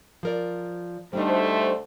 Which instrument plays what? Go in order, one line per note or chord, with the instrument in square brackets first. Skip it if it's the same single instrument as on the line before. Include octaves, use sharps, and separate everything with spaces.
[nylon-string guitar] F3 A#4 D5
[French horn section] D2 A3 C5 [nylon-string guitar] G3 D4 D#4